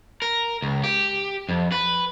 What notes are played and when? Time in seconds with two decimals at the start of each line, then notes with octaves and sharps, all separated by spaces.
0.22 A#4
0.62 C#2
0.84 G4
1.49 F2
1.72 B4